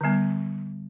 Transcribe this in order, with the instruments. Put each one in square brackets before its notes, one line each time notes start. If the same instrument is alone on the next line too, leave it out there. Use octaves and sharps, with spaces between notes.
[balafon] D3 G3 B3